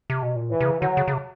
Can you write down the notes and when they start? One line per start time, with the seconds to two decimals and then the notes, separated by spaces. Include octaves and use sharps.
0.10 C3
0.23 B2
0.36 A#2
0.50 A2 E3
0.61 C3
0.66 C#3
0.81 D3 F#3
0.97 C#3
1.08 C#3
1.13 C3